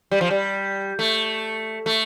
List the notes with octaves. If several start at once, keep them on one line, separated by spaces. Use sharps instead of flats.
G3
F3
G3
A3
A3